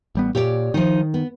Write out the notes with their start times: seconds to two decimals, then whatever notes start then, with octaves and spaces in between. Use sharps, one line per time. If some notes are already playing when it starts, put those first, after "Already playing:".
0.15 A1 G3 B3
0.35 A#2 G4 C#5 D5
0.74 D#3 F3 D#4
1.14 B3